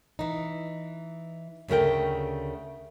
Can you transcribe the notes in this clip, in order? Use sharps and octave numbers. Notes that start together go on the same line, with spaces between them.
E3 D#4
D2 C#3 A3 A#4 G5